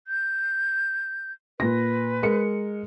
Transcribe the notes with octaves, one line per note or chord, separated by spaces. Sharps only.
G6
A#2 B4 A#6
G#3 A#4 C#7